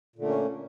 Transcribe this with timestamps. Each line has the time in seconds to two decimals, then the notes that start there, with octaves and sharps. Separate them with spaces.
0.16 A#2
0.19 D3
0.22 A3
0.24 A#3
0.27 C#4